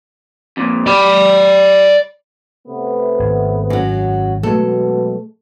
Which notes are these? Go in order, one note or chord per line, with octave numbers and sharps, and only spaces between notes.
F2 A#2
G4 D5 B5
C3 A3 B3
G#1
F#2 F#3
B2 F#3 G#3 A3 A4